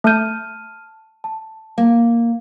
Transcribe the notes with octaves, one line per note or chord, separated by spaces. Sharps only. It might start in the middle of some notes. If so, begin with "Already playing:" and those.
A3 A5 F6 G6 D#7
A5
A#3 F5